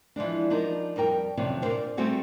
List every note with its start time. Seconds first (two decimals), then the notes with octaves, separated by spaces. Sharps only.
0.16 E3 F3 G#3 D4
0.50 F3 D4 D#4 A#4
0.96 F2 G3 A#4 G5
1.37 F2 C3 D#3 F#3 C#4 D4
1.62 A#2 D#3 D4 A#4 C5
1.97 G3 A3 C4 F#4 G#4 A4